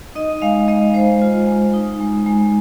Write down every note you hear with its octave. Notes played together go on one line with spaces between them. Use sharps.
D#4 D#5
G#3 F5
G#3 D#5
G#3 C5
F4
G#3
D#4
G#3
G#3